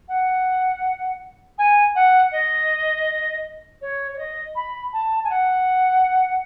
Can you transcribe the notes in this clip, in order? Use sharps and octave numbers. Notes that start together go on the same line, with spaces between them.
F#5
G#5
F#5
D#5
C#5
C#5
D#5
B5
A5
G#5
F#5